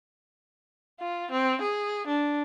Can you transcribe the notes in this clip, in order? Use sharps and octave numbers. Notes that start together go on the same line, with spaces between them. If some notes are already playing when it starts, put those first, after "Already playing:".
F4
C4
G#4
D4